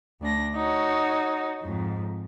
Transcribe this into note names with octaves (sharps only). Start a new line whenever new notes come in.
D2 D4 A#6
D#4 F#4 C#5
F2 G#2